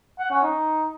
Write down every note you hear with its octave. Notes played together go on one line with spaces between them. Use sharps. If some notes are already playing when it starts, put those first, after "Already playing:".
F#5
C#4
D#4